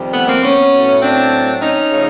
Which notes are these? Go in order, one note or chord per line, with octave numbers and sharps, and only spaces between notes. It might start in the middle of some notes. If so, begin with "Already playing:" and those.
Already playing: F2 C3 D#3 G3
A3 B3
A#3 C4
B3 C#4
A2 F#3 A3
C4 D4
C#4 D#4
C#3 F3 A3